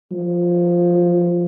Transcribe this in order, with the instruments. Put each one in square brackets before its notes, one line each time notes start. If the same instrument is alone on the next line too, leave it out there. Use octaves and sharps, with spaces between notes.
[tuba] F3